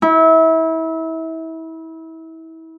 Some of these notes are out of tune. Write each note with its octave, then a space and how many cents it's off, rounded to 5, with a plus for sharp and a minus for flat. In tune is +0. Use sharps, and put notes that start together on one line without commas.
E4 -30